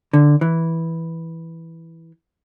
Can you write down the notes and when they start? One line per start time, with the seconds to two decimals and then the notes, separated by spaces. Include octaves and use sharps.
0.13 D3
0.41 E3